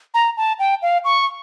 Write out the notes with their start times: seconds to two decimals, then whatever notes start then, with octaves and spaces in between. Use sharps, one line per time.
0.14 A#5
0.37 A5
0.59 G5
0.82 F5
1.04 C#6